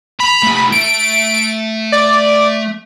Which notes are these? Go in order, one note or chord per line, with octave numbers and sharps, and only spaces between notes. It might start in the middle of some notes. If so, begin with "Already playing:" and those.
A#5 B5
A3 D#4
A3 D7
D5